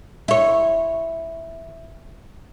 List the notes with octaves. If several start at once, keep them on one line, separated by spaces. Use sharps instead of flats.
E4 C#5